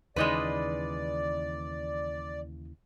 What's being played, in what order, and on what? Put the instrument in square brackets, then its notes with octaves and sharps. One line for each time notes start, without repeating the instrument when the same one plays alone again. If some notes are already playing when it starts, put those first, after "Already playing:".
[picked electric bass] D#2 C#3 E3 [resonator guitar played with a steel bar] G#3 D#4 B4 [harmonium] D5